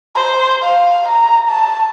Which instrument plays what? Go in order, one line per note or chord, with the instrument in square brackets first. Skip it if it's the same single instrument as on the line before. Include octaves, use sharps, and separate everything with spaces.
[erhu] C5
F5
A#5
A5